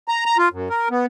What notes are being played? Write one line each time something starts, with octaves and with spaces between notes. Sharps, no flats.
A#5
A#5
F4
F#2
A#4
B3